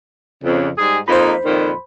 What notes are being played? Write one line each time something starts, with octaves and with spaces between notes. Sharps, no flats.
F2 C#3
G#2 G3 G#4
F2 A#3 D#4 C5 B5
F2 A#2 D#3